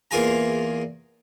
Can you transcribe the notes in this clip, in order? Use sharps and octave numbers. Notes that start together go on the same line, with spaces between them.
E2 A#3 F4 G#4 G#5 A#5